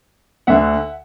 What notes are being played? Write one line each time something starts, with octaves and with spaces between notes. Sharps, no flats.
D2 D3 E5 F#5